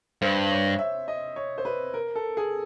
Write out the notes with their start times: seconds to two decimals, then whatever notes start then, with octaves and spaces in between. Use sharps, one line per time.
0.22 G2 C5
0.50 C#5
0.79 E5
1.08 D#5
1.36 C#5
1.58 C5
1.65 B4
1.94 A#4
2.16 A4
2.37 G#4